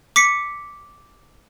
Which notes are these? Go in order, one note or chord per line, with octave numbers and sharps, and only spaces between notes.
D6 B6 C#7